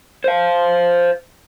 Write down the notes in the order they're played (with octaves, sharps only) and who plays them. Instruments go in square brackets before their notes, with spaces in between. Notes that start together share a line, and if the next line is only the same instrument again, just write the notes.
[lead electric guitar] C5 F5